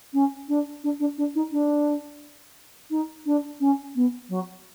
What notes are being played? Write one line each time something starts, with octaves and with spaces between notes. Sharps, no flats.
C#4
D4
D4
D4
D4
D#4
D4
D#4
D4
C#4
B3
F#3